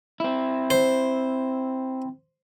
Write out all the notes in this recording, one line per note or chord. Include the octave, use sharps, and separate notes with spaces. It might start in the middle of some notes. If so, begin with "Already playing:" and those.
C4 E4
C5